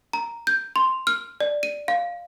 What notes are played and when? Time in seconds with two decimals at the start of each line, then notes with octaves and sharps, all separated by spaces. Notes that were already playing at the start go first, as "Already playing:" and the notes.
0.13 A#5
0.47 G6
0.76 C6
1.07 F6
1.40 D5
1.63 D#7
1.88 F5